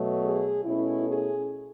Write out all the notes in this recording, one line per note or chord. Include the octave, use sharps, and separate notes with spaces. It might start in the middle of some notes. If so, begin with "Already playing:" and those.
Already playing: B2 F#3 A3
G#4
B2 A3 C#4 E4
G#4